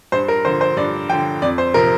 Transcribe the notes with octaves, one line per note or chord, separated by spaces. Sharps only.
G2 C5
A#4
D3 F3 C5
C5
G2 D5
D3 F3 G5
F2 D5
C5
C3 F3 A#4